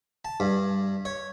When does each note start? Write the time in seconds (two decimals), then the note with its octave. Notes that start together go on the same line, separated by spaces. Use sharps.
0.25 A5
0.40 G2
1.05 C#5